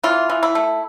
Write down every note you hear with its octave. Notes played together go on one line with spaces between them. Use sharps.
E3 F4
E3
E4
A3